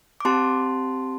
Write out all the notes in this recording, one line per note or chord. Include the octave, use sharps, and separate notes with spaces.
D6
C4 G4 A5 C6